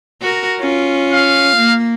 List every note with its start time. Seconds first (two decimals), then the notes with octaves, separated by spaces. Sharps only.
0.22 F#4 A#4
0.59 C#4 F4
1.13 F5
1.56 A#3